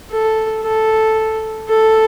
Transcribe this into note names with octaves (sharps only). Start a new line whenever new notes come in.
A4
A4
A4